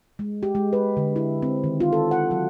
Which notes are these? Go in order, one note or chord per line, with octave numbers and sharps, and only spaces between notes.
G#3
G4
G#3
B4
D3
E4
C4
D#3
F4
A4
F#5
F#3